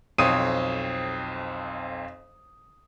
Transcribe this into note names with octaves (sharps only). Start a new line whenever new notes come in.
B1 F2 C4 C#5 D#6 D#7